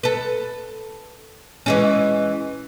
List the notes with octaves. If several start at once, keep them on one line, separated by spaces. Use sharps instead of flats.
A4 B4
E3 G#3 C#4